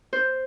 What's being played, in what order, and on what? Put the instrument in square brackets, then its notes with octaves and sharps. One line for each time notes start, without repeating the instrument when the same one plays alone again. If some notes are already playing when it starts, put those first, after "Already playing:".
[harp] C5